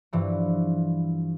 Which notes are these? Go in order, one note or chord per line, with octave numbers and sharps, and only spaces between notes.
G2 E3 F3